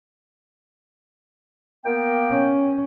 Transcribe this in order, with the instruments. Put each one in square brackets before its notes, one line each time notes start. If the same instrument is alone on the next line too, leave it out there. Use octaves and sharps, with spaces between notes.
[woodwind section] A#3 B3 G5
[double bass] C#4